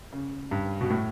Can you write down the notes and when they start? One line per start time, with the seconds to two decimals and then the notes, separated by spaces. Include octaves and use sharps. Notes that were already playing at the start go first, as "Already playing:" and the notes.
0.13 C#3
0.51 G2
0.81 B2
0.90 A2